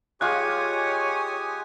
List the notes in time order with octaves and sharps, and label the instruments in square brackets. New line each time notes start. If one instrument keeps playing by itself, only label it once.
[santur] G#3 F4 D6 [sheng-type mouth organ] G4 G#5 D#6 [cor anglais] C#5 [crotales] F#6